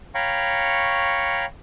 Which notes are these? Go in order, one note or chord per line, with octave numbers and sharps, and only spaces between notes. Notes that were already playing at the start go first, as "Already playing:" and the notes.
C#5 F5 G5 A#5 B5 C#6